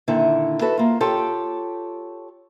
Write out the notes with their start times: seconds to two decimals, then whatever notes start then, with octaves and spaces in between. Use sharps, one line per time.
0.08 A#2 D3 D#3 E4
0.61 E4 F#4 A4 B4
0.77 A#3 F4
1.00 F4 G4 A4 C#5 G5 A5